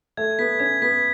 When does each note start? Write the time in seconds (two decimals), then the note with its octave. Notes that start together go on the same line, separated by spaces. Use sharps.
0.17 A3 G#6
0.39 B3 B6
0.60 C#4 G#6
0.82 B3 B6